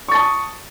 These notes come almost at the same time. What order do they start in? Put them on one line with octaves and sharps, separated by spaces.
C#6 A6 A5 D#6